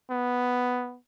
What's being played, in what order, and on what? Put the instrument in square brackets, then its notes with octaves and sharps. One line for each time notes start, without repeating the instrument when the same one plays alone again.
[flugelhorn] B3